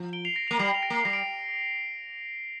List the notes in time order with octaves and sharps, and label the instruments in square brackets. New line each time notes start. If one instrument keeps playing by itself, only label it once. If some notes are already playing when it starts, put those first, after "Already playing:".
Already playing: [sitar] F3
[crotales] D7 G7
C7 F7
A#6 D7
C7 F7
[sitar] A#3
[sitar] G3 [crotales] C7 F7
[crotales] F7
A#6 D7
[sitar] A#3 [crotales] C7
[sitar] G3 [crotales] A#6
[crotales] D7